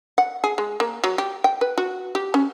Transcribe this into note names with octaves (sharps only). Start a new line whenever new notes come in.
F#5
G#4
G#3
A#3
F#3
G4
G5
B4
F#4
G4
C#4